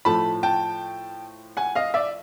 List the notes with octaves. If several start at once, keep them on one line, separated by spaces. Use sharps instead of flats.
A2 F3 A3 A5 B5
G5 A5
F#5 G#5
D#5 F5
D5 E5